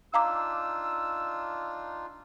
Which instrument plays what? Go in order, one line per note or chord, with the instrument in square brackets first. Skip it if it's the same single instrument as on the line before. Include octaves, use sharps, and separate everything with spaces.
[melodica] D4 D#4 F4 [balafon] F5 A#5 D6 [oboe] E6